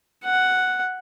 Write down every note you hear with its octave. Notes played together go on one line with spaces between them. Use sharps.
F#5